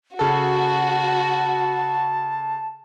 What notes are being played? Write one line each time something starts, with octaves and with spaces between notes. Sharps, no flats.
C#3 F#4 A4 A5